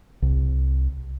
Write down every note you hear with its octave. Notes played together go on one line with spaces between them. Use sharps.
C2